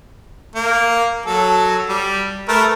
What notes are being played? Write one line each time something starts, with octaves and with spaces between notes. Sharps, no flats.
A#3
F#3 A4
G3
A3 A#4 B4